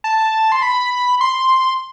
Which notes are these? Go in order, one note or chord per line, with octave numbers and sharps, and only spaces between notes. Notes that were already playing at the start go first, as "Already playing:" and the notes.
A5
C6
B5
C6